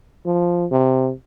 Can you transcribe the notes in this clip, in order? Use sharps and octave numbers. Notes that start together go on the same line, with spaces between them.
F3
C3